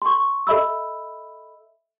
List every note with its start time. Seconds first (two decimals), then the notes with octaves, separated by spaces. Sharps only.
0.02 C6 C#6
0.47 A4 D#5 E5 B5 E6